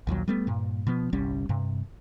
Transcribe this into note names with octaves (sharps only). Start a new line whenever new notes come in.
A#1 D#2 A#2 F#3
G3 A3 B3
G2 A#2
B2 F3 B3
G1 C2 G3 C#4
G2 C3